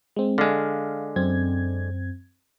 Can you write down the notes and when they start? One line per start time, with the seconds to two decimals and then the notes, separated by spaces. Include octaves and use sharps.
0.16 G#3 C4
0.38 D3 G#3 F5
1.16 F#2 C4 G#6